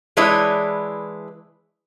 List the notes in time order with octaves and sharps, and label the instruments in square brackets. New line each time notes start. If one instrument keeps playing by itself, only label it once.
[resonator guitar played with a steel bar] E3 G#3 D4 E4 B4 C#5